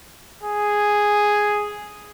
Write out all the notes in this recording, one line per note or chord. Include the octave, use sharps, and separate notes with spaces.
G#4